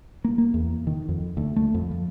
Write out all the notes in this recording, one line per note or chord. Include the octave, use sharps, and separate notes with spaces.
A#3
A#3
E2
D#3
F2
D2
A3
F2
F3